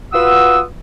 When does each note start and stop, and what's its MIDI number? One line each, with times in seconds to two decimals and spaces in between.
0.13 0.60 65
0.13 0.60 66
0.13 0.60 71
0.13 0.60 78
0.13 0.60 87
0.13 0.60 88